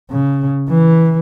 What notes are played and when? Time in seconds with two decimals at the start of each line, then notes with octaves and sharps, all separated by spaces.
0.10 C#3
0.69 E3